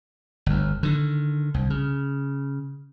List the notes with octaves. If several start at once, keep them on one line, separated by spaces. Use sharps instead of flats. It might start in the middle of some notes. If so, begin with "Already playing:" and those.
G1 D2
D3 D#3
C2
C#3